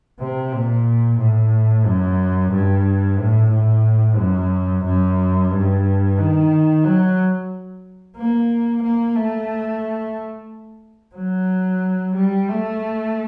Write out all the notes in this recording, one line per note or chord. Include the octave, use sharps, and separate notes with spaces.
C3
A#2
A2
F#2
G2
A2
A2
F#2
F#2
G2
D#3
F#3
A#3
A#3
A3
F#3
G3
A3